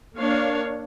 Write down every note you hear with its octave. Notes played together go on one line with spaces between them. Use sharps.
A#3 D4 C#5 F5